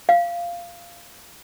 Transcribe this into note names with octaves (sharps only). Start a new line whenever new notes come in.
F5